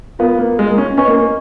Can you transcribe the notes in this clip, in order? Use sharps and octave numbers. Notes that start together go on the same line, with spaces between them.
B3 F4 A#4 F5
A#3
G#3
A#3
C#4
C#4 B4 D#5 G#5 C#6
A#3
A#3